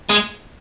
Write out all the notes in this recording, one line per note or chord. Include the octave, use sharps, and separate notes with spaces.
G#3